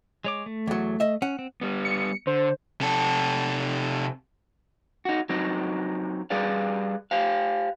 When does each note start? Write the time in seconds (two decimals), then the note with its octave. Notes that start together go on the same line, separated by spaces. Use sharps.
0.25 G#3 C#5 D6
0.46 A3
0.67 E2 F#3
1.00 D#5 E5
1.22 C#4 F#5
1.39 C4
1.61 G3 B3
1.85 C#7
2.27 D3 C5
2.81 C3 A4
5.05 D#4 F#4
5.29 F#3 C4 D#4
6.30 G3 G#4 B4 D5 F5
7.11 G4 C5 F5